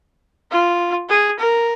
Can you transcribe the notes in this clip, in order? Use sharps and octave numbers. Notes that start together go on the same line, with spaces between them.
F4
G#4
A#4